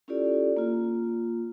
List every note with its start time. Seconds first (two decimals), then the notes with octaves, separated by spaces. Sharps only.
0.08 C#4 E4 F4 G4 A4 D5
0.57 A#3 F4